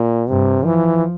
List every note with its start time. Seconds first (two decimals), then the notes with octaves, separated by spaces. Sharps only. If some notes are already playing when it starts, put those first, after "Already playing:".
Already playing: A#2
0.28 G2 C3
0.65 E3 F3